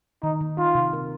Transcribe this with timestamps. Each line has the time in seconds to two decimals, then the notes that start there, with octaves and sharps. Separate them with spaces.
0.23 D#3 D#4
0.41 D#3
0.58 D#4 F4
0.75 C3
0.93 A#4